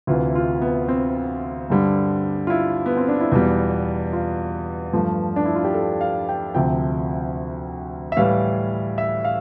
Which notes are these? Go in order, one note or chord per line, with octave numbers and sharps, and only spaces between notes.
D2 C3 E3 F4
F4
B3
C4
G2 D3 G3
F4
E4
B3
C4
D4
E4
E2 B2 G3 F4
F4
G2 F3 A3
D4
E4
F4
G4
A4
F5
G5
D2 C3 F3 G5
E5
A2 E3 G3 F5
E5
F5